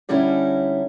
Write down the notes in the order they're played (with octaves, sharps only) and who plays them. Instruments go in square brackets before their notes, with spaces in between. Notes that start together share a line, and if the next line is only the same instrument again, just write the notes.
[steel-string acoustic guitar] D3 G3 C#4 D#4 E4